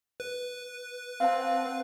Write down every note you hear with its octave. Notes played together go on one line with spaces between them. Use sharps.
B4
C4 F5 F#5 A5